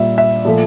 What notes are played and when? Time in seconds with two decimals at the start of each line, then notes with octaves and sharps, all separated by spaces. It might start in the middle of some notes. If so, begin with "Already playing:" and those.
Already playing: A#2 G3 E5
0.18 E5
0.45 A#2 F3 A3